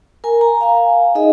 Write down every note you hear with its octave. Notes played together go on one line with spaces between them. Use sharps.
A#4 G#5 A#5
A#5
F5 G#5
D#4 G#4 D#5 E5